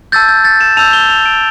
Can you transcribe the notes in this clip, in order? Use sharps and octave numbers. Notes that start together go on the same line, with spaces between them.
A5 E6 G6 A6
G6
A6
E7
A5 E6 G6 F7
G7
F7
D7